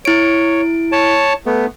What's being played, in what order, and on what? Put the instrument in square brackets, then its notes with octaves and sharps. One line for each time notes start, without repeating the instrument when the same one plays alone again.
[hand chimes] E4 D7 [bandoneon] C#5
[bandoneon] C#5 A5
A3 B3